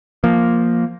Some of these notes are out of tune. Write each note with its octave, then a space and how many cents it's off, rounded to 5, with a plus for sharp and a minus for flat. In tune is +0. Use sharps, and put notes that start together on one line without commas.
F3 +0 A#3 +0